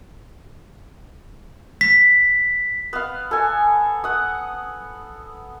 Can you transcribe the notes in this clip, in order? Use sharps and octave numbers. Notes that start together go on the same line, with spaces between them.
B6
B3 F5
A4 G#5
F#5 D#6